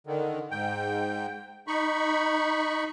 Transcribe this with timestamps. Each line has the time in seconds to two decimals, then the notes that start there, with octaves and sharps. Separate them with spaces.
0.07 D3 D#3
0.51 G#2 G5
1.67 D#4 B5 C#6